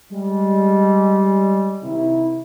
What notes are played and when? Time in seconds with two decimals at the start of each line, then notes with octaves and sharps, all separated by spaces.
0.11 G3 G#3
1.83 C3 D#3 E4